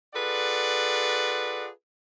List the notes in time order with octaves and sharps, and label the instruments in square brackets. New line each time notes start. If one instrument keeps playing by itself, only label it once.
[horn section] F4 G#4 A4 B4 D5 F#5